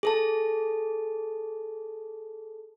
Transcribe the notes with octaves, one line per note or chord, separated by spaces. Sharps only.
G#4 A4 A5